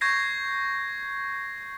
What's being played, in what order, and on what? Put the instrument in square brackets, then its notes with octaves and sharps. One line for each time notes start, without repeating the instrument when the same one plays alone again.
[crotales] C#6 G6 G#6 A#6 C7